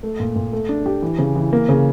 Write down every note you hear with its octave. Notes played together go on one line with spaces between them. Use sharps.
A3
A#2
A#2
A3
D4
G4
E3
C#3
E3
A#3
C#3